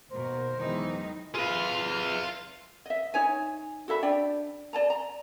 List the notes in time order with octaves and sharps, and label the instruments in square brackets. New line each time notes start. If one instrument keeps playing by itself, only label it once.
[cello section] D#2 B2 A#4 [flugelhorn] C5
[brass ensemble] E2 E3 [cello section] D#3 F#3 G#3 [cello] D#4
[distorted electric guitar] F4 F5 [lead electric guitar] G#4 B4
[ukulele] D#5 E5
D#4 C#5 G#5
F#4 A4 E5 B5
D4 D5 G5
D5 A5 A#5
A#5